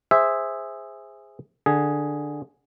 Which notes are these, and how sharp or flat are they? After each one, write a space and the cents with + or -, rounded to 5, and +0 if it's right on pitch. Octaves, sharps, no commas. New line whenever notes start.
G#4 -15 C5 +0 E5 +0
D3 +10 G#4 +0